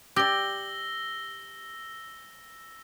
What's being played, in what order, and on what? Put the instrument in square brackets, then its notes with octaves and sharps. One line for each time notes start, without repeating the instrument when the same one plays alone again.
[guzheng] G4 D5 [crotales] E6 A#6 G7